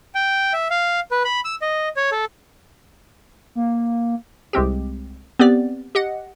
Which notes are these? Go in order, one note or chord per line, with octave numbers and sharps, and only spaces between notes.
G5
E5
F5
B4
B5
E6
D#5
C#5
A4
A#3
C2 G#3 C4 G4
B3 C4 G4 D5
G4 D#5 F#5